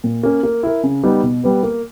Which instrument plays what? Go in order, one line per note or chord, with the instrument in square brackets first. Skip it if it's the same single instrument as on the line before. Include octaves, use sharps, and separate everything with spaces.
[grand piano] A#2
A#3 C#4
A#3
E4 A#4
C#3
G3 B3 D#4 G4
B2
G3 B3 G4 B4
A#3